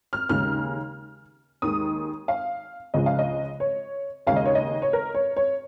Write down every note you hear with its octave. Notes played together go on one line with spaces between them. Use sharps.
F6
D#2 C#3 G#3 F6
D#2 D#3 G#3 D#6
F5
C#2 C#3 F3 G#3 D#5
F5
D#5
C#5
D#2 C#3 G#3 F5
D#5
C#5
D#5
C#5
A#4
C#5
C#5